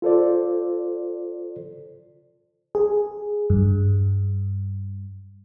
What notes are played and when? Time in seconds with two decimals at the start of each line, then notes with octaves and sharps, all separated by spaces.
0.02 F4 A4 C5 D5
2.75 G#4
3.50 G2